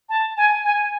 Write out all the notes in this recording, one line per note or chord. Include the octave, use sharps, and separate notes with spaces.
A5
G#5
G#5